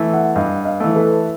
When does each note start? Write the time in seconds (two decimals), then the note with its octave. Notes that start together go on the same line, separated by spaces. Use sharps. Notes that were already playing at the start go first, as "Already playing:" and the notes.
Already playing: E3 A3
0.13 E5 F#5
0.35 G2 D#5 F5
0.65 D#5 F5
0.80 E3 A3
0.95 A4 B4